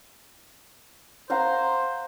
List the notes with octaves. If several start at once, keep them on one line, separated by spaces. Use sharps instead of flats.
C5 F5 F#5 A#5